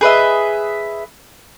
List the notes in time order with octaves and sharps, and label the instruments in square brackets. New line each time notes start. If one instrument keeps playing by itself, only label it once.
[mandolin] G#4 B4 D#5 E5